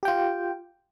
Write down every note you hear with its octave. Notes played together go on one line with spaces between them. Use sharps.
F4 G4 G5